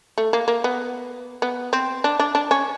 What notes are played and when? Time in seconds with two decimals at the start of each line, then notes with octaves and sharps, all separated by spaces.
0.18 A3
0.33 A#3
0.48 A#3
0.64 B3
1.42 B3
1.73 C4
2.04 D4
2.19 D4
2.35 D4
2.51 C#4